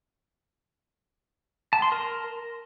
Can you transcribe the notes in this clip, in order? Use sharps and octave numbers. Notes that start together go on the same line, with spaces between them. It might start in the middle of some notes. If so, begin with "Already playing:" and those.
A5
C6
A#4